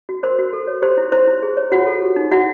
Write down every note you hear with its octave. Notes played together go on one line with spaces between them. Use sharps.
F#4
A#4 C5 C6
F#4
A4
C#5
G4 C5 C6
E4
E4 C5 C6
E4
G#4
C#5
F4 F#4 F#5
A4
G4
D#4
E4 F#4 F#5